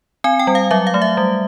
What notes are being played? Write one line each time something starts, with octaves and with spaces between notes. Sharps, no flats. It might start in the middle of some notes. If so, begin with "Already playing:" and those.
C4 G#5
G5
G3
F5
F#3 E5
F5
A3
E5
G3